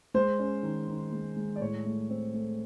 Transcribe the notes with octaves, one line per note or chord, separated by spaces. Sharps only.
G#3 C5
C#4
D#3
D#3
G#3
G#3
D5
A2 C#5
A3
C4
A3